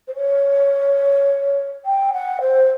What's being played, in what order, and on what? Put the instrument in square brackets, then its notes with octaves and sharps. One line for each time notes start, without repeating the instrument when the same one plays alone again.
[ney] C5
C#5
G5
F#5
C5